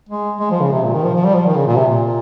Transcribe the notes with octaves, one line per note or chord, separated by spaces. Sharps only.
G#3
G#3
F3
C#3
C3
A#2
D#3
F3
F3
G3
F3
D#3
C#3
A#2
C3
A#2